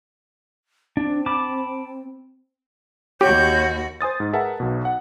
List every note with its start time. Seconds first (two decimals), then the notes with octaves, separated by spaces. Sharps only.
0.97 C4 D4
1.26 A5 B5 D6
3.21 D#2 F#4 G4 C#5 G6
4.01 C5 G#5 D#6 A6
4.20 G#2
4.33 G#4 A#4 B4 E5 F#5 A5
4.60 B1 B2
4.85 F#5